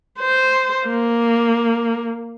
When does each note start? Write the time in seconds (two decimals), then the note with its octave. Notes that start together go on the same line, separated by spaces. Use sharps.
0.19 C5
0.86 A#3